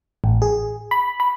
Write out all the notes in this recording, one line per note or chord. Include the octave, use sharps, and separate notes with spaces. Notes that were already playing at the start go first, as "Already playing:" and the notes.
A1
G#4
B5
B5